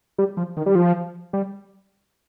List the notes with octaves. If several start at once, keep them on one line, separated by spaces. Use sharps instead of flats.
G3
F3
D#3
G3
F3
G3